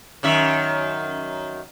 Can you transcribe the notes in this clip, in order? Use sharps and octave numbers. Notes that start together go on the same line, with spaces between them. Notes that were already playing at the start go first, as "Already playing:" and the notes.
F#2 D#3 E5